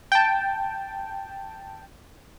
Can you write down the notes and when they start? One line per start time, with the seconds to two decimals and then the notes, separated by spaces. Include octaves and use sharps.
0.12 G5 A5